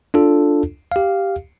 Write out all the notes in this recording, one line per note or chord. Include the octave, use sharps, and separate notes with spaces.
D4 F4 A4
G4 F5